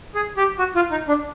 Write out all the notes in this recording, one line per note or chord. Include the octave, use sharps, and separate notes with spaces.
G#4
G4
F#4
F4
D#4
D4